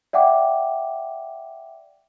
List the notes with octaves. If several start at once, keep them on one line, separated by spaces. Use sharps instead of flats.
D5 E5 F#5 G5 D6